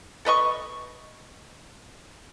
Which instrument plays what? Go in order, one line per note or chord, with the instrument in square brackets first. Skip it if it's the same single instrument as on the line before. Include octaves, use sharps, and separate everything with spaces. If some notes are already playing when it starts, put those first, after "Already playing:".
[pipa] A4 B4 D#5 C#6